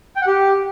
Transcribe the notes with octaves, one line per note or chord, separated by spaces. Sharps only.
G5
F#5
G4